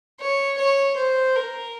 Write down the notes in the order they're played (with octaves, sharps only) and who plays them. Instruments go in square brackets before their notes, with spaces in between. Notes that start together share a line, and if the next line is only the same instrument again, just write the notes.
[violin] C#5
C#5
C5
A#4